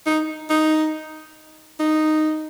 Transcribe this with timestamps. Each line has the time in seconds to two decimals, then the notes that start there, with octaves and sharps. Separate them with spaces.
0.06 D#4
0.50 D#4
1.80 D#4